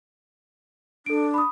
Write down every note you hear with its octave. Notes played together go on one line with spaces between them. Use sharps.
D4 A4 D7
B5 D#6